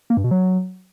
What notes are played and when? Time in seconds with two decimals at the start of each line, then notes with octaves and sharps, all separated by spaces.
0.10 A#3
0.17 G2
0.24 B2
0.31 F#3